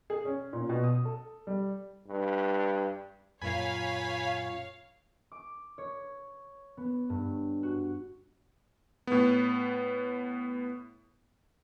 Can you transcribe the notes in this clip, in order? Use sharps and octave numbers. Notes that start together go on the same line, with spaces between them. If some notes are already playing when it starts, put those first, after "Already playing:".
G#4
C#4
A#2
B2
D#6
A4
G3
G2
F#2 A#2 C#5 F5 G#5 B5
D6
C#5
B3
G2
F#4
A2 B3